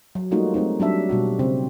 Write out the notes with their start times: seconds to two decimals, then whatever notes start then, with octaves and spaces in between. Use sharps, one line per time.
0.15 F#3
0.31 G3 A3 A#3 D#4 F4 F#4
0.54 G#3 A3 C4 D#4
0.80 F#3 G3 D4 E5
1.09 B2 G3 F#4
1.39 C#3 C4